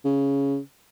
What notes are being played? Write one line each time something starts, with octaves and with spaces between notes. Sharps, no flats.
C#3